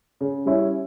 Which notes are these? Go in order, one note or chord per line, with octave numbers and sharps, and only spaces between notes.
C#3
G3 C#4 E4